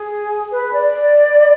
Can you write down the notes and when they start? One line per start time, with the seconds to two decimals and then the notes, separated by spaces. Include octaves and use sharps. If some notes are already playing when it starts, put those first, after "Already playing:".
Already playing: G#4
0.51 B4
0.74 D5